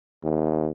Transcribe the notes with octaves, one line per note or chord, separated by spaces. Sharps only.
D#2